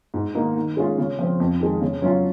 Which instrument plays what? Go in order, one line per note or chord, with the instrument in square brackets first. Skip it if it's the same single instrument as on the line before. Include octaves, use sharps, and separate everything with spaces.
[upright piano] G#2
D#3 A#3 D#4
D#3
G#3 C#4 F4
C#3
F3 C4
F2
D#3 G#3
C#3
F#3 C#4 F4